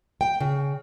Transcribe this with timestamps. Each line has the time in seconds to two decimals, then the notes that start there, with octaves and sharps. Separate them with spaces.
0.21 G5
0.41 C#3